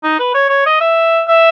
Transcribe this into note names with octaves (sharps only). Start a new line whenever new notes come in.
D#4
B4
C#5
C#5
D#5
E5
E5